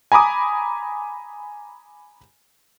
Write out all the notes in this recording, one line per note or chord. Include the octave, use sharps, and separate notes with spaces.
G#5 A#5 B5 D6 D#6